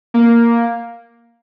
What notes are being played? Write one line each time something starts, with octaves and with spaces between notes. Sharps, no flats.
A#3